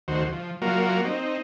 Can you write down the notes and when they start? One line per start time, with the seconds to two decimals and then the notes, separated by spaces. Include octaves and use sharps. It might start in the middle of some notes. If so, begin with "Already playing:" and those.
0.08 D2 D#3 F#4 C5
0.33 F3
0.62 F#3 A#3 F4 F#4 A#4
1.05 C4 D#4